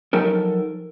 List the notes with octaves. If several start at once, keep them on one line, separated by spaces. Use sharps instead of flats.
F3 F#3 D#4 A4 A#4